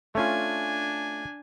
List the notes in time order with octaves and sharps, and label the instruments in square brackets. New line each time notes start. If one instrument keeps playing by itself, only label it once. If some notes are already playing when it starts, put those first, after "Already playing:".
[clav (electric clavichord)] A3 C#4 F4 [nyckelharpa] D4 G#5